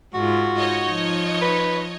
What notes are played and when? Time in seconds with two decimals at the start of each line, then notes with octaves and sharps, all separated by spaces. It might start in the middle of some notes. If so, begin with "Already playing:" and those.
0.14 G#2 F4 F#4
0.58 D#4 C#5 D#5
0.90 F3
1.42 B4